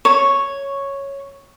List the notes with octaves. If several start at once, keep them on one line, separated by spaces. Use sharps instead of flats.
C#5